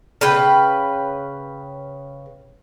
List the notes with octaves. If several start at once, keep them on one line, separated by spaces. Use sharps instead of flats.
C#3 B4 G5